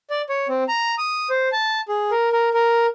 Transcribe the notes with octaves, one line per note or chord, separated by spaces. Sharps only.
D5
C#5
C4
A#5
D#6
C5
A5
G#4
A#4
A#4
A#4